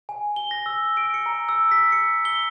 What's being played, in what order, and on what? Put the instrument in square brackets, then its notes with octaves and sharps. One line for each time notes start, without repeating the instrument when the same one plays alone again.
[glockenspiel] G#5
G7
A#6
E6
D7
C#7
A#5
E6
B6
C#7
G7